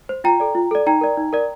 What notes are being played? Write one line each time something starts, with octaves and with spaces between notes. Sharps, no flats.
C5
F4 G5 A#5
A4 D5
F4
A4 D5
D#4 G5 A#5
A#4 D5
D#4
A#4 D5